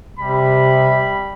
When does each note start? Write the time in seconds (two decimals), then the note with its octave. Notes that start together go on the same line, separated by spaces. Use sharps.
0.19 C3 G3 B5